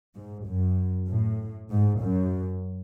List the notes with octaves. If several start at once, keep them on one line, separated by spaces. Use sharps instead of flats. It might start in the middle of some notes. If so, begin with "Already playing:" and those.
G#2
F#2
A2
G#2
F#2